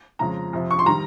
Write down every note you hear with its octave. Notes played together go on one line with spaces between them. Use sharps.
F2 C#3 G#3 A#5
F2 C3 F3
C#6
C6
D#3 G3 A#5